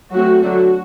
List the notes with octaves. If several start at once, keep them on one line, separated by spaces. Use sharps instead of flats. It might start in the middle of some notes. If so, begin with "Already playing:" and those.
F#3 A3 C4 F#4
D3 F#3 A3 D4 F#4